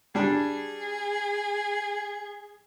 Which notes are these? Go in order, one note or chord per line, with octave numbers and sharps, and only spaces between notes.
G3 D4 G#4